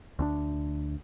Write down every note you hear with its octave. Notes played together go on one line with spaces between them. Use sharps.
D2 C#4 D4